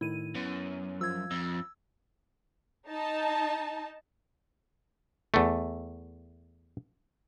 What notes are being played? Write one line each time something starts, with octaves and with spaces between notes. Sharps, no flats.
A2 D#3 E4 D#7
F#2 B3
F3 F4 E6 G#6
F2 E6
D#4 A5
E2 A3